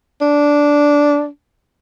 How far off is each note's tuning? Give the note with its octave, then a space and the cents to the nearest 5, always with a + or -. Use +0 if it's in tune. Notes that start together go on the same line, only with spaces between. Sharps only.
D4 -10